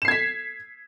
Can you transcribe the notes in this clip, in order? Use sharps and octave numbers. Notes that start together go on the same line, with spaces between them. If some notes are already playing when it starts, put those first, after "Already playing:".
G#6 B6 C7 E7